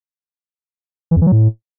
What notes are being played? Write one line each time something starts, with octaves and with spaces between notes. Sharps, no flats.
E3
F2
E3
F#3
A2